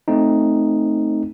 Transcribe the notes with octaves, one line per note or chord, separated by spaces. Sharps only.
A3 C4 D#4